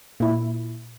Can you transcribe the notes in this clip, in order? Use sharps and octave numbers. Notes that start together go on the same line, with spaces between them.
A#2 E4